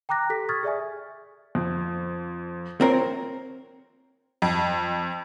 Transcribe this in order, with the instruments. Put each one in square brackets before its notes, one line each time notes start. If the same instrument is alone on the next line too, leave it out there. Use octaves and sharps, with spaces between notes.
[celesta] G5 A#5 D6 F#6 A#6
G4 A4 B6
C#6 D#6 F6 G#6 A6
G#4 D5 E5 G#5
[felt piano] F2
[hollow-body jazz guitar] C4 A#4 [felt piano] F4 C5 C#5
[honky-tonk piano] F2